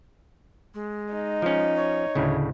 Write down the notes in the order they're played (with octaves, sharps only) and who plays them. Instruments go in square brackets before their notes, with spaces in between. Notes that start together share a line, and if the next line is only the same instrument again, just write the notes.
[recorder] G#3
[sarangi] D#4
[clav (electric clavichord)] F3 C#4
[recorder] C#5
[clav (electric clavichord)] D2 A2 C#3